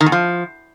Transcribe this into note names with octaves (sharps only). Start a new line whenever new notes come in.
D#3
E2
F3